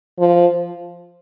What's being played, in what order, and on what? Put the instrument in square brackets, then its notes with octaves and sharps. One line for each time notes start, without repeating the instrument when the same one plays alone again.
[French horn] F3